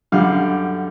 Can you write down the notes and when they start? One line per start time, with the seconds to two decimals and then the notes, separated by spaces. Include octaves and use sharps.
0.12 F#2 D3 G3 F5